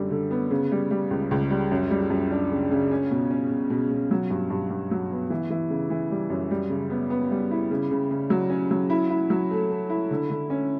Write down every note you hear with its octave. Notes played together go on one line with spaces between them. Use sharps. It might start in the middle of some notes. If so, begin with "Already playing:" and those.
Already playing: F#2 D3 G3
D3
B3
C#3
G3
G3
C#2
C#2
G3
F#2
G3
F#2
D4
C#3
C#3
C#4
B2
C#4
B2
B2
B2
F#3
G2
G2
G2
F#3
B3
E3
E3
C#3
E3
G3
F#2
G3
C#3
B3
B3
G3
E4
C#3
C#3
C#3
F#3
C#4
F#3
E4
E4
F#3
A3
A3
E4
D3
D3
C#4